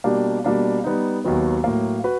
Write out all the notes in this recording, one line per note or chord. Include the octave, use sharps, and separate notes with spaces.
B2 G3 A#3 D4 G4
B2 G3 A#3 D4
G3 B3 D#4
D#2 D#3 F#3 B3
A2 F#3 A#3
F#4 B4